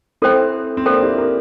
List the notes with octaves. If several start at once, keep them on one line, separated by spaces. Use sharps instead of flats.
C4 E4 A4 C5 G5
C4
A#3 D4 A4 C5 G5
E4 G4
G4 A#4